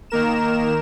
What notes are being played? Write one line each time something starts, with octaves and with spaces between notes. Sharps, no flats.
D#3 A#3 A#4 E7